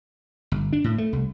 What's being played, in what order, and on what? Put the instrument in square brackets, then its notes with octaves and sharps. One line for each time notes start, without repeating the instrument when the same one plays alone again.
[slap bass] G1
D4
A2
A3
C2